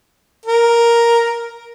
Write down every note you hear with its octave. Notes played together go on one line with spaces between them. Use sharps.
A#4